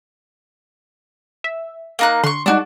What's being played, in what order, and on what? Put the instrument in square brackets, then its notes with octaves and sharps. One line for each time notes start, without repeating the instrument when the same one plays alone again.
[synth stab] E5
[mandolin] A#3 D#4 F#6
[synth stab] D3 [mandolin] C6 C#6
[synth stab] G3 G#3 D#4 [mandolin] D4 F#4